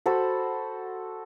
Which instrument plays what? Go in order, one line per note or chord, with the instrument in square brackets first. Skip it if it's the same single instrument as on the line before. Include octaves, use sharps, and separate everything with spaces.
[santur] F#4 A4 C5 B5